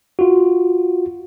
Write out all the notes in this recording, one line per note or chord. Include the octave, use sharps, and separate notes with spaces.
F4 F#4